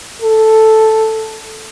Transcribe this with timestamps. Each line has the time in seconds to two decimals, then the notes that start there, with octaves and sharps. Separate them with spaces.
0.22 A4